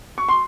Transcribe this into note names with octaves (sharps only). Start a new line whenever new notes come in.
C#6
C6